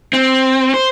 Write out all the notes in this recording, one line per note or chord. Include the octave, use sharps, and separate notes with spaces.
C4
C5